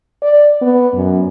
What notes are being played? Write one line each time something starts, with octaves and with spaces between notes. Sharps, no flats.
D5
B3
F#2